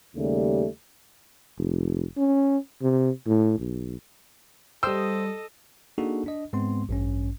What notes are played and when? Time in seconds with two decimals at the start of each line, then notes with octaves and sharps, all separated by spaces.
0.15 D#2 C#3 G3 A3
1.58 F1
2.17 C#4
2.82 C3
3.27 A2
3.59 B1
4.83 G3 A4 C5 D#5 G5 D#6 E6
5.98 A#3 D4 D#4 F#4 G#4 A4
6.26 D4 D#5
6.53 G#2 G#3 B3 C4 C6
6.89 A1 G2 C#4